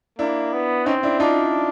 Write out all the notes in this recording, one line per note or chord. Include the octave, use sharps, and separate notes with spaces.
A#3 D4 E4
B3
C4 C#4 D#4
D4 E4
D4 D#4 F4